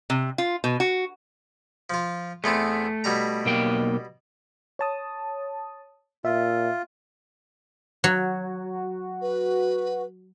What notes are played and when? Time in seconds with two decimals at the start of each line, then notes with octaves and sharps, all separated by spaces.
0.10 C3
0.38 F4
0.64 B2
0.80 F#4
1.90 F3 F4
2.44 E2 A3 B3 C4
3.04 B2 G3 A#5
3.46 B1 A#3 G5
4.79 C#5 A5 D#6
6.25 A#2 F4 E5
8.04 F#3 F#4
9.21 B4